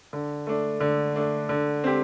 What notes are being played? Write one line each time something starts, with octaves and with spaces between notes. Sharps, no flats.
D3
A3 D4
D3
A3 D4
D3
C4 G4